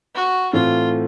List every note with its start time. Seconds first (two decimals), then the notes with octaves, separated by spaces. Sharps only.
0.15 F#4
0.53 A2 E3 A3 C4 F4